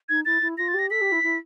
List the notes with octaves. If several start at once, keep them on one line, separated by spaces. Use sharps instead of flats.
D#4 G#6
E4 A6
E4
F4 A#6
A6
G4
A#6
A4 B6
G4
E4
E4